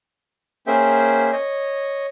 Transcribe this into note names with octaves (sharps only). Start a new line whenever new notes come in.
A#3 C#4 G#4 C5 E5 G5
C#5 D#5